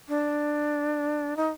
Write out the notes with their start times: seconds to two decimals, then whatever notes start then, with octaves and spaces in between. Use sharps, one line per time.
0.08 D4
1.37 D#4